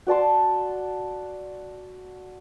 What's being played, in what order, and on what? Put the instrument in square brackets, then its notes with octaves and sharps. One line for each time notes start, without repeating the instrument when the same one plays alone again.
[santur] F#4 D5 A5 C6